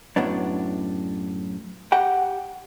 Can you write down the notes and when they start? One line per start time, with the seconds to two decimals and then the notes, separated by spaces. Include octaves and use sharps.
0.16 F#2 A2 B3 D4
1.92 G4 F#5 G5